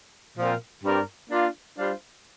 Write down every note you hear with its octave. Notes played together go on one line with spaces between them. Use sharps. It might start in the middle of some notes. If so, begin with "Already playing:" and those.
A#2 F3 C4 F4 A#4
G2 G3 C4 A#4 D5
A#3 D4 F4
G3 D4 F4 C5 F5